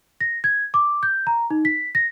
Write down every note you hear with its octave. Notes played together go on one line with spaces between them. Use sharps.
A#6
G#6
D6
G6
A#5
D#4
B6
A#6